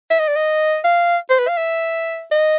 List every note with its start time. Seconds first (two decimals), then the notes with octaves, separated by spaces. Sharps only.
0.10 E5
0.20 D#5
0.28 D5
0.36 D#5
0.84 F5
1.30 C5
1.39 B4
1.48 F5
1.57 E5
2.31 D#5